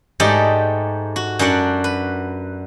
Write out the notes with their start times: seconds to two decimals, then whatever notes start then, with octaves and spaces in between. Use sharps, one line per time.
0.20 G#2 A3 G4 D5 D#5
1.16 F#4
1.39 F#2 D4 F#4 D5 F#5
1.84 B4